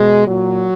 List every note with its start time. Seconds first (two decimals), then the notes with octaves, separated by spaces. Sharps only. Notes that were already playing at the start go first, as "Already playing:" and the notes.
Already playing: B2 G#3
0.26 A#2 F#3